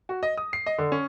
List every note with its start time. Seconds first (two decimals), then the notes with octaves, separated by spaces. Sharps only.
0.09 F#4
0.23 D#5
0.37 D#6
0.53 C7
0.66 D#5
0.78 D3
0.92 C#4